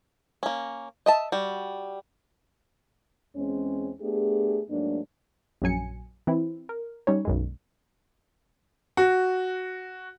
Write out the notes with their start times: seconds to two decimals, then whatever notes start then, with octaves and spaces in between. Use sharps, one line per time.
0.43 A#3 C#4
1.06 D#5 E5 A5
1.32 G3 F#4
3.35 E2 G#3 C4 C#4
4.01 A3 B3 D4 G4 G#4
4.69 G#2 F#3 A3 A#3 D4
5.62 A#1 F#2 F#3 G#5 C#7
6.27 E3 C4 E4
6.69 A#4
7.07 G3 C#4 D#4 C#5
7.25 B1 F#2 G#3
8.97 F#4